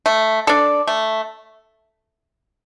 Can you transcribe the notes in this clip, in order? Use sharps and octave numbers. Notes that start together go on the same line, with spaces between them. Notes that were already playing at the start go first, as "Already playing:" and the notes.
A3
D4 A4 D5
A3